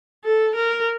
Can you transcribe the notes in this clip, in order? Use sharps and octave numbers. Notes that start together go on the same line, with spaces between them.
A4
A#4